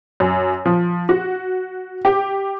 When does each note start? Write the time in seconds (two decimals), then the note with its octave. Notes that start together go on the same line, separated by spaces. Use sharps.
0.20 F#2
0.66 F3
1.09 F#4
2.05 G4